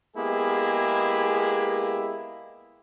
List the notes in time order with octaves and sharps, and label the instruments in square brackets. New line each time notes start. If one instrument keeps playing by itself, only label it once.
[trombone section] G#3 A#3 B3 E4 G4 G#4